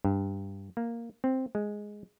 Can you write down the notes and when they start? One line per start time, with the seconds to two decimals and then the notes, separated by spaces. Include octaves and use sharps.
0.05 G2
0.77 A#3
1.24 C4
1.55 G#3